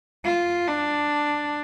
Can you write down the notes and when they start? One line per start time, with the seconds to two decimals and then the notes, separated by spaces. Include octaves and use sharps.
0.24 F4
0.67 D4